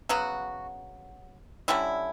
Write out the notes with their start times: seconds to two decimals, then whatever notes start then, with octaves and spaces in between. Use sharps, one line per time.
0.09 C#3 F#3 B3 F#4
1.68 D3 G3 C#4 E4